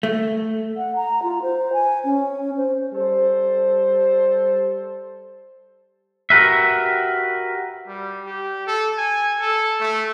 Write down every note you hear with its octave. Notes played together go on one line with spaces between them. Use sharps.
A3
F#5
A#5
F4
C5
G#5
C#4
C5
G3 A4 C5
F#4 G4 A#4 B4 E5
G3
G4
A4
G#5
A4
A3